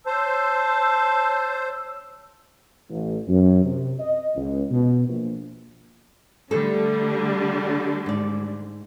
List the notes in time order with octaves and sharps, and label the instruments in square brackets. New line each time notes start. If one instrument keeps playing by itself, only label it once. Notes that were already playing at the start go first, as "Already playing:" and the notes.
[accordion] C5 [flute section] C#5 E6 [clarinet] A5
[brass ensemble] A1
F#2
C3
D#5
C#2
B2
A#1
[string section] D3 G3 A3 [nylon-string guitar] A4
[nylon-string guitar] G#2 D5